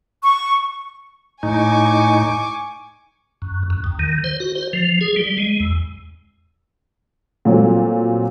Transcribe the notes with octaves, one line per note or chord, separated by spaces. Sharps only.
C#6
A2 D#4 G#5 C#6 D6
F#2
F#2
D#2
D#3
C5
F#4
C5
F3
G#4
G3
G#3
E2
A#2 F#3 G3 A3 C4